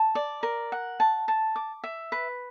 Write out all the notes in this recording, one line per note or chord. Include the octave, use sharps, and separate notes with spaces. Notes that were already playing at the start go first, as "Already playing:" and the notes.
Already playing: A5
D5
A#4
F#5
A5
A5
D6
E5
B4